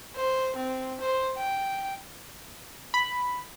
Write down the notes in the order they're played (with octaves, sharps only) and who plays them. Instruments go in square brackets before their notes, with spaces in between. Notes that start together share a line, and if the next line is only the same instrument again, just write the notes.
[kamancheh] C5
C4
C5
G5
[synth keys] B5